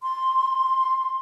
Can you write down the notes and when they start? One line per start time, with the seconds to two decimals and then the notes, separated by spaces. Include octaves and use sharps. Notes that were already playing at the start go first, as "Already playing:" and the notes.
0.02 C6